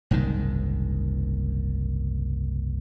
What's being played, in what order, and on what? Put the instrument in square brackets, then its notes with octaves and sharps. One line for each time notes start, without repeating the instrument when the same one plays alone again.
[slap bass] F#1 C2 G#2 D#3